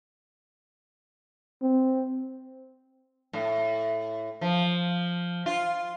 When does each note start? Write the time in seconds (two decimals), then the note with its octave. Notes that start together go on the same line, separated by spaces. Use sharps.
1.62 C4
3.33 A2
4.41 F3
5.46 F4